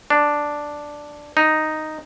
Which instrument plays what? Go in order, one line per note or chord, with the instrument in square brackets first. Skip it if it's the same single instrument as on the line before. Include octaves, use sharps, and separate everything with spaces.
[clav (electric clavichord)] D4
D#4